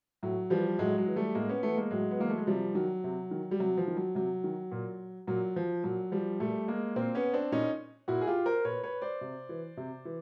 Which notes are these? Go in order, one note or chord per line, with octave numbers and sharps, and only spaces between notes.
A2 F#3
E3 F3 G3
A2 F#3 G#3
F#3 G#3
E3
G3 A3
A2 G#3 A#3
B3 C#4
E3 A3 B3
G#3 A#3
A2 F#3 G#3
B3
E3 A#3
A3
G#3
C3 F3 G3
D#3 F#3
C3
D#3
G3
C3 F#3
F3
D#3
F#3
C3 F#3
D#3
A#2
A#2 F#3
F3
A#2 F#3
F3 G3
A#2 G3 A3
G#3 A#3
A#2 A#3 C4
B3 C#4
C4 D4
A#2 C#4 D#4
A#2 E4 F#4
G#4
F4 G4
A#4 C5
A#2 B4 C#5
B4 C#5
C5 D5
C3
E3
C3
E3